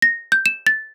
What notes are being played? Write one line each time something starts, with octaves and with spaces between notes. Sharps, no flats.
A#6
G6
E7
A6